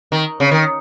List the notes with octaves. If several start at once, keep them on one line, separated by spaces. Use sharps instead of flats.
D#3
C#3
D#3